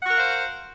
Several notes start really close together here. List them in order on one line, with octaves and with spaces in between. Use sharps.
F#5 F#4 A#4 F5 C5